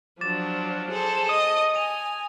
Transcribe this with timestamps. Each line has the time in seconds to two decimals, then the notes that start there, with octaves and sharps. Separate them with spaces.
0.21 F3 F#3 D4 D6 A6 E7
0.90 G#4 A4 C5
1.29 D#5 D#6
1.75 G#5 D#7 F7